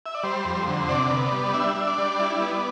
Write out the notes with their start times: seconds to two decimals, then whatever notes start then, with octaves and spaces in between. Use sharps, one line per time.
0.06 E5
0.15 D5
0.23 G3 C5
0.45 F2
0.68 D3
0.89 C3 D5
1.10 B3
1.32 G3
1.54 D4 E5
1.76 D4
1.87 D5
1.98 G3
2.20 E4
2.41 B3